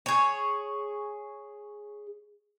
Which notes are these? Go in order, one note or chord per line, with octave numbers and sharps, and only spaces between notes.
G#4 C#5